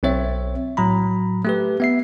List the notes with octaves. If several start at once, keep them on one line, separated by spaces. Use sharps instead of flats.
B1 C4 C#5 E5
A2 F#3 A#5 B5
A3 G4 B4
B3 E5 C7